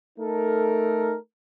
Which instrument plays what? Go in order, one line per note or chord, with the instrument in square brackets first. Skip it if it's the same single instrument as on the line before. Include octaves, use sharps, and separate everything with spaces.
[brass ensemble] A3 D#4 A4 A#4